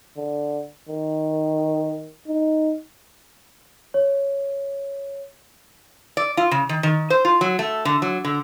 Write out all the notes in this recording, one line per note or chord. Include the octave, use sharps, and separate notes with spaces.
D3
D#3
D#4
C#5
D5
F4
C#3
D#3
D#3
C5
F4
F#3
A3
D3
F#3
D3